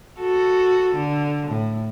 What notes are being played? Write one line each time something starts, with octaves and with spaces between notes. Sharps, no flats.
F#4 A4
D3
A2